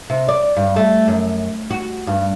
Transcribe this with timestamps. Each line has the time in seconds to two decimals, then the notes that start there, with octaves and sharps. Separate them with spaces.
0.10 C3
0.28 D5
0.56 G2
0.76 A3
1.08 F#2
1.71 F#4
2.07 G2